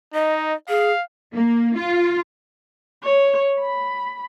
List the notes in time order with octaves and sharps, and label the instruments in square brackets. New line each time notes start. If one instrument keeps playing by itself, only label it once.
[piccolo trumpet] D#4 [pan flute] D#5
[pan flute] G#4 [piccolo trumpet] F5
[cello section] A#3
F4
[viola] C#5
B5